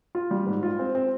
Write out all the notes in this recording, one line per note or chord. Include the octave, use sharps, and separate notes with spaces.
F4
G3
G#2
F4
C4
C4